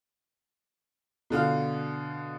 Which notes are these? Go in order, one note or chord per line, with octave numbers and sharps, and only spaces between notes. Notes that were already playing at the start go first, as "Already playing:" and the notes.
B2 D3 F5 F6